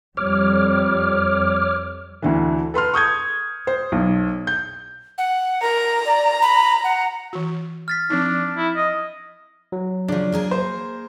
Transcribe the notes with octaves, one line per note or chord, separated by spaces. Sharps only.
F2 G3 C#5 D6 F6
D2 D3 E3
A4 B4 C6 F6
C#6 D#6 G6 G#6
C5
B1
G6
F#5
A#4 A#5
D5
B5
F#5
E3 F#4
F6 A6 B6
F3 C4 D4 D#4
E4
D#5
F#3
C#3 F3 D4
A#3 G#4 A#4
C5